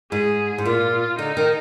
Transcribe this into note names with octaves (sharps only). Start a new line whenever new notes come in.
G#2 G#4
G#2
A#2 F4
D3 D#4
D#3